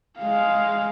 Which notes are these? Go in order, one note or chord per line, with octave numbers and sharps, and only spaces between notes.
G#3 F5